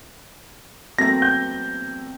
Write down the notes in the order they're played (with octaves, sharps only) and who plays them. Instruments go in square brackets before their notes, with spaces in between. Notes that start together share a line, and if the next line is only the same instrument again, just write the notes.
[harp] E2 C4 [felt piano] F#3 A3 A#3 [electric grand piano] A#6
[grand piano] G6